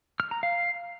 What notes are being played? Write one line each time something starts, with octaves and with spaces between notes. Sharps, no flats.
F6
A#5
F5